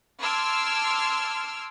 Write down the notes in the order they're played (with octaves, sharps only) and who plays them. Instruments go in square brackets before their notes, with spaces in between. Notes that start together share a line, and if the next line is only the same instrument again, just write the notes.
[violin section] A5 C6 D6 E6 F6 G#6